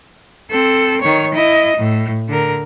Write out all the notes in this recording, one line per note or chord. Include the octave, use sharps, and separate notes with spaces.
C4 A4
D#3 C#5
E4 D#5
A2
D3 A#4